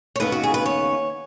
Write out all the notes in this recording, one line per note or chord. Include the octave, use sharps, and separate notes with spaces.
C#5
D#2 C#3 B3 B4
F#4
G#4
B4
C#5